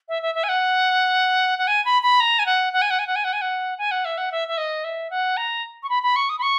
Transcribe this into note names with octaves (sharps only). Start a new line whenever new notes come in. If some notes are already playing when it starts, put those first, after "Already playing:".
E5
E5
E5
G#5
F#5
F#5
G#5
B5
B5
A#5
G#5
F#5
F#5
G#5
F#5
G#5
F#5
G#5
F#5
G#5
F#5
G#5
F#5
E5
F#5
E5
E5
D#5
E5
F#5
A#5
C#6
B5
B5
C#6
D#6
B5
C#6